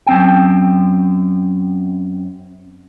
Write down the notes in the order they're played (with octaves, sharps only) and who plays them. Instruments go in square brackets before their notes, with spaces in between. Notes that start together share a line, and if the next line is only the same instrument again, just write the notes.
[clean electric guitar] F#2 C4 G5